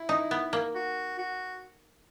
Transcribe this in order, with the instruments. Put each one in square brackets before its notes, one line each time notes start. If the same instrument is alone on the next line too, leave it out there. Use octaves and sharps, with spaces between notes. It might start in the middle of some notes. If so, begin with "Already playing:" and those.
Already playing: [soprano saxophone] E4
[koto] D#4
B3
A#3
[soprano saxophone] F#4
F#4